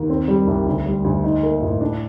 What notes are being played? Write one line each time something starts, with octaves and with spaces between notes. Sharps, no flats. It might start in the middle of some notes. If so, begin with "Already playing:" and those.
Already playing: D#2
C4
G3
C2
D2
G3
D2
D#4
A#3
A2
D4